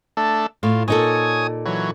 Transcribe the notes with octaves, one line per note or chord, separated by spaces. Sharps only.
A3 D4 A4
A2 F4
A#2 D#4 A4 C#5 G#5 D#6
E3 F#3 C#5